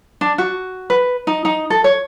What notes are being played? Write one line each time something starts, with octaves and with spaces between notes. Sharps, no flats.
D4
F#4
B4
D#4
D#4
A4
C#5